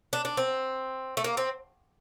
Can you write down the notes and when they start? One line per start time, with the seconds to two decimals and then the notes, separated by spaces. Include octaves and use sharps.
0.13 D4
0.25 D4
0.37 C4
1.17 A3
1.24 A#3
1.37 C4